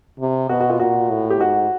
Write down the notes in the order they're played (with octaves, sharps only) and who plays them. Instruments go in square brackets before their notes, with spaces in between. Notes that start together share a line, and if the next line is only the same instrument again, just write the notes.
[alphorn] C3
[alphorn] B2 [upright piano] F#4
[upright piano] F#4
F4
[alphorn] A#2 [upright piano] F#4
[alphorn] A2
[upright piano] G4
[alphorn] G#2 [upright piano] F#4